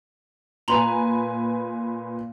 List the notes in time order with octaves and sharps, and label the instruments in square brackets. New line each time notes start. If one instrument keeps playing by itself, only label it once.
[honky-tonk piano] A#2 B4 G#5 [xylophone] A#5 C6 F#7